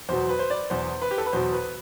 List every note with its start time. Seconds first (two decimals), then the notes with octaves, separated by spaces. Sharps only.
0.09 E2 B2 F#3 C5
0.29 B4
0.39 C5
0.50 D5
0.70 E2 B2 F#3 C5
1.02 B4
1.11 G4
1.18 A4
1.26 B4
1.33 E2 B2 F#3 C5
1.53 B4